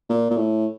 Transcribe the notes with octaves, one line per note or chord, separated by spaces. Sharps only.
A#2
A#2
A2